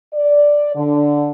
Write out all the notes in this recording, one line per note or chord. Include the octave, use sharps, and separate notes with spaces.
D5
D3